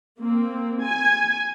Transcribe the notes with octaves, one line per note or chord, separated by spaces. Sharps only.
A#3 C4
G#5